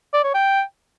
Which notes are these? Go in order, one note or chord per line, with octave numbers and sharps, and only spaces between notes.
D5
C#5
G5